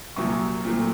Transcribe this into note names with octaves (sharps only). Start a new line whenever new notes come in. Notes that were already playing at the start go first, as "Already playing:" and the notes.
C2 A#2 F#3 C#6
A#2 F#3 A3 C4